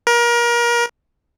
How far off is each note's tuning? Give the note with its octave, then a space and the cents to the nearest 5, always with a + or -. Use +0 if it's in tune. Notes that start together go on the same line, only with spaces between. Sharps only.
A#4 +30